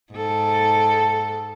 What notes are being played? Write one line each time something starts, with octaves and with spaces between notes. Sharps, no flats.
G#2 A4